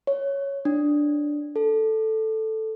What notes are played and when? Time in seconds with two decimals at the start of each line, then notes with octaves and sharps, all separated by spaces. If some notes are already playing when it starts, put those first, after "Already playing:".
0.07 C#5
0.65 D4
1.56 A4